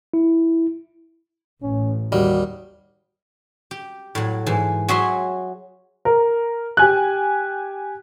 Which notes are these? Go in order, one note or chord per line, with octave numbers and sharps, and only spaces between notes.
E4
A1 C#4
D#2 G3 F#4
G4
A2 F#3
G#2 E3
F#3 F#4 G#4 C#5 E5 C6
A#4
G4 G#5 F#6